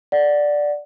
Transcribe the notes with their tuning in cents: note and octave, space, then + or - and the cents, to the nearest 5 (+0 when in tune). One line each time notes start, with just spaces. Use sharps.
D5 +0 F#5 +0